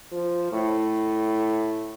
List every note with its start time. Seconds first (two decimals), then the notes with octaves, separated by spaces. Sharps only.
0.12 F3
0.52 A2